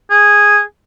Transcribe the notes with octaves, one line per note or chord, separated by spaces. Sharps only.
G#4